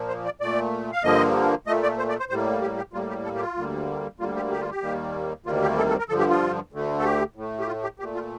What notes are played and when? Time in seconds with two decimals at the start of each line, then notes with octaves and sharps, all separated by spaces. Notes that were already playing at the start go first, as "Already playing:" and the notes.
Already playing: A#2 F3 A#3
0.08 C5
0.25 D5
0.41 A#2 A3 D5
0.93 F5
1.03 G2 D3 F3 A#3 D#5
1.67 A#2 A3 D#5
1.83 D5
1.98 C5
2.09 D5
2.19 C5
2.30 A2 G3 A#3 C5
2.62 G4
2.77 G4
2.93 A2 G3 A#3 F4
3.09 G4
3.25 A4
3.36 G4
3.41 F4
3.57 D2 D3 G3 A#3
4.20 D2 D3 G3 A#3 F4
4.36 G4
4.51 G4
4.60 F4
4.71 G4
4.82 D#2 D#3 G3 A#3
5.46 D2 C3 D#3 G3 A#3 F4
5.62 G4
5.78 A4
5.89 A4
5.99 A#4
6.09 G2 D3 F3 A4
6.19 G4
6.30 F4
6.72 D2 D3 A3
6.99 A4
7.05 G4
7.36 A2 A3
7.60 G4
7.67 F4
7.83 G4
7.99 A#2 A3 G4
8.15 F4